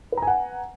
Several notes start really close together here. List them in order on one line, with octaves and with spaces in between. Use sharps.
B4 A#5 G#5 F#5